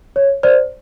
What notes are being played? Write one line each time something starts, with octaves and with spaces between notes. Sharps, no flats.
C#5
C5 D5